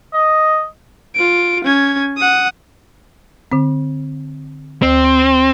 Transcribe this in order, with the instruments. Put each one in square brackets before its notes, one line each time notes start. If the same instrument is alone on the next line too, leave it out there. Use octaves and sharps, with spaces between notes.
[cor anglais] D#5
[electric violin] F4 D7
C#4 G#6
F#5 D#6
[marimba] D3 C4
[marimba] D2 [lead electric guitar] C4